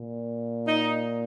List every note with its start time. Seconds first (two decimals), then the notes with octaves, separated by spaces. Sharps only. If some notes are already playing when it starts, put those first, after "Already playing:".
Already playing: A#2
0.68 D#4